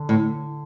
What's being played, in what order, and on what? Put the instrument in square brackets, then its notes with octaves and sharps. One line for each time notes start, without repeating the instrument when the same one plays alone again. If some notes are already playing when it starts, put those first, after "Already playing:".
Already playing: [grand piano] D3
[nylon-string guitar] A2